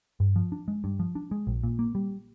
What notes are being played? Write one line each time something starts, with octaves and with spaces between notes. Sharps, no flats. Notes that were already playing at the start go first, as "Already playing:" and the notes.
G2
F3
D4
G#3
G2
F3
D4
G#3
A#1
A#2
A#3
G3